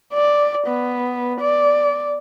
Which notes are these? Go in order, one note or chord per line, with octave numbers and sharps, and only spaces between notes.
D5
B3
D5